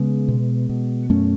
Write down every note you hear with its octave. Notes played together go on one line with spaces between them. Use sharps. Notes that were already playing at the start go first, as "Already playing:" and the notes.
Already playing: C#3 G#3 B3
B2
B2
F#2 A3 C#4